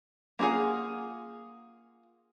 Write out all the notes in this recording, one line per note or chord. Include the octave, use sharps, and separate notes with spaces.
A#3 E4 F4 G#4 F#5